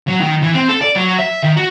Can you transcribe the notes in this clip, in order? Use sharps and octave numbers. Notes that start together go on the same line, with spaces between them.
F#3
D#3
E3
C4
A4
D5
F#3
E5
D#3
F#4